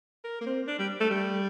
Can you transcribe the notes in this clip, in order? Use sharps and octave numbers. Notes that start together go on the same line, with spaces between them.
A#4
A#3
C4
D4
G3
A3
G3